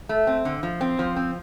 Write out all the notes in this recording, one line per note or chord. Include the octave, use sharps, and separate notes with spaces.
A3
C4
D3
F3
C4
F3
C4